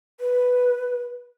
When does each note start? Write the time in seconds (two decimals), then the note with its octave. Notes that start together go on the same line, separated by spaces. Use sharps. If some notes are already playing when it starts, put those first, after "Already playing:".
0.20 B4